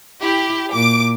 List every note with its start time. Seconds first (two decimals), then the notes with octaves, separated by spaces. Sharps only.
0.22 E4 G4
0.73 A#2 D6 D7